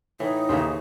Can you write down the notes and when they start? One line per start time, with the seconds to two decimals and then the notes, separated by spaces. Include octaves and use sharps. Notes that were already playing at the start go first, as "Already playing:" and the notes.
0.20 A2 E3 D#4
0.49 D#2 C#3 E3 C5